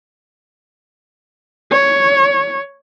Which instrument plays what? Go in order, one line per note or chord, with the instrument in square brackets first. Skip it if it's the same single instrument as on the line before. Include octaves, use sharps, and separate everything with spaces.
[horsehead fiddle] C#5